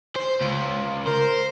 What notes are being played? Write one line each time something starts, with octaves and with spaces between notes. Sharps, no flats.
C5
C#2
A#4 C5